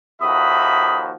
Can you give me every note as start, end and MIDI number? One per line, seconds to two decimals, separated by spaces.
0.21 1.12 39
0.21 1.12 53
0.21 1.12 66
0.21 1.09 69
0.21 1.09 76
0.21 1.09 83
0.21 0.98 87